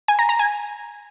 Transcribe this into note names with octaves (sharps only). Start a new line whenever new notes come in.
G#5
A#5
A#5
G#5